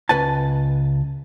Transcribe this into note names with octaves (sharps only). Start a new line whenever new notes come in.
C#2 B4 G#5 A5